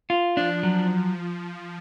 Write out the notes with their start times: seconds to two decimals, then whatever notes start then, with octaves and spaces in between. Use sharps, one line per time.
0.10 F4
0.37 F3 D4
0.63 F#3